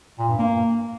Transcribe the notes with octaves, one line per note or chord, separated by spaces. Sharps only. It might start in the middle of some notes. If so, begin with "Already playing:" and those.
A#2
G2
A#3